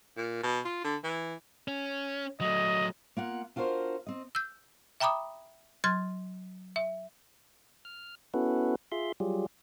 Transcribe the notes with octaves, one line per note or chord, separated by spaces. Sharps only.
A#2
B2
F4
D3
E3
C#4
F#3 A3 D#5
A#3 F4 F#5
D4 F4 F#4 A#4 C5
C4 D#5
E6 G6
E5 G5 A#5 B5 D6 D#6
F#3 C6 F6 G#6 A6
E5
F6
B3 C#4 E4 F#4 A4 B4
F4 G#4 E5 C6
F#3 G3 F4 G4 G#4